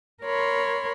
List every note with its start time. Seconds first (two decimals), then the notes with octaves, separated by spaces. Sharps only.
0.23 A#4 C#5 B5 C6